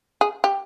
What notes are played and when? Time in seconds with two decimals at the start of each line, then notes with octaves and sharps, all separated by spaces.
0.21 G#4
0.44 G4